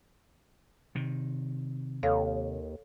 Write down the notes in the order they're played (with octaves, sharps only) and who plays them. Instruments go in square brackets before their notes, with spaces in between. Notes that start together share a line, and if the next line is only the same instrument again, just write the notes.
[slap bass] C3 D#3
[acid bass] D#2 [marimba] A4 C#5 F5